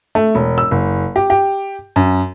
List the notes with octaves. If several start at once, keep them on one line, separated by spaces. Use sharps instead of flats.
A3
E1
E6
F#1
G4
G4
F#2